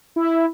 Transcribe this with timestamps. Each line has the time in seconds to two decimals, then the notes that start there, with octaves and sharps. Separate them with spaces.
0.16 E4